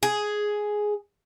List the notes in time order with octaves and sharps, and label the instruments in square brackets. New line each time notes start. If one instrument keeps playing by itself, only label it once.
[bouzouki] G#4